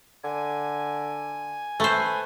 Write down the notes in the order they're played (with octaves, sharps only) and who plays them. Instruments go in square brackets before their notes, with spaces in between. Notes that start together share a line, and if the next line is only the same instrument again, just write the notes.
[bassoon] D3 [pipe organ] G#5
[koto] A3 C5 [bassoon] B4